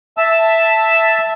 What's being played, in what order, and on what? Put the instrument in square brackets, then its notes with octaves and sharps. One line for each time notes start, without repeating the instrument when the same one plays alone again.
[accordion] E5 A5 E6